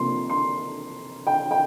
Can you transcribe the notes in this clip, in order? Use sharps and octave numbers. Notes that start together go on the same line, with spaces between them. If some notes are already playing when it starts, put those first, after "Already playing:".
Already playing: C3 F3 A#3 C6
C6
G5
G5